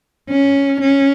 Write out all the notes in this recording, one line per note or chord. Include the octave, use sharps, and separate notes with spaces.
C#4
C#4